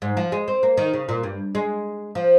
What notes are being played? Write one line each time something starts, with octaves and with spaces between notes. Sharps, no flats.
G#2
F3
G#3
C4
A#3
D#3
C#3
A#2
G2
G#3
F3